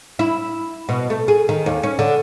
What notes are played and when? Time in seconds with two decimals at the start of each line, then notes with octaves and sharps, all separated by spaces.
0.19 E4
0.89 B2
1.10 A3
1.28 G#4
1.49 D#3
1.66 D#2
1.83 C#4
1.99 D3